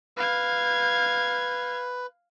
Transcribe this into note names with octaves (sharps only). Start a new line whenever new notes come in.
B4 F5 G#6